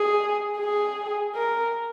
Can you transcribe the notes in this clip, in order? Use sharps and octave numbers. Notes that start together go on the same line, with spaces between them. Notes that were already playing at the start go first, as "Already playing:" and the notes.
Already playing: G#4
G#4
A#4